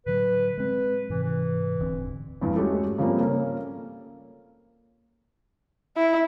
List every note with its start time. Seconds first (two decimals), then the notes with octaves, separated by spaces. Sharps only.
0.06 A2 D3 F#3 B4
0.58 G#3 C4 B4
1.10 G#2 C3 E3
1.23 E3
1.80 D#1 D2 C4
2.41 E2 G2
2.56 G#3 A3 C#4 F#4 G4 A4
2.98 C#3 F3 G3 A#3 C4
3.20 A#3 C#4 A4
5.96 E4